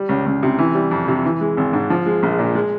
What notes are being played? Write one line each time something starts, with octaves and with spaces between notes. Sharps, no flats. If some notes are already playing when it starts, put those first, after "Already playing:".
Already playing: G3
C#2
C#2
C3
E3
G3
F2
C3
E3
G#3
G#1
G#2
F3
G#3
A#1
A#2
G#3